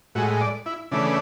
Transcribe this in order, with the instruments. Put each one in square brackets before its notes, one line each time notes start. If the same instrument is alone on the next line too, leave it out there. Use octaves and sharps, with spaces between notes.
[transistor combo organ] A2 G#3 F#4
D5
E4
C#3 E3 A3 D4